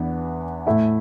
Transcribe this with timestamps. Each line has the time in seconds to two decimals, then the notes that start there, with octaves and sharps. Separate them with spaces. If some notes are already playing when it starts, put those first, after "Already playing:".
Already playing: E2 E3 B3 D4
0.67 A2 A3 E4